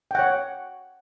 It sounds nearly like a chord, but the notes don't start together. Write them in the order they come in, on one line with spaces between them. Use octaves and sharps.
G5 F#5 C#5